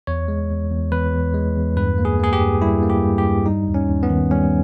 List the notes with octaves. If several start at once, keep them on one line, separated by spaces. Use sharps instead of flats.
E2 C#5
G#3
E2
E2
E2 B4
E2
G#3
E2
G2 B4
A#3
G#4
A#3 G#4
G4
G2
G3 E4
A#3
G4
G2
G4
G2
G3 D#4
D#2
C#4
D#2
B3
D#3
G3 C#4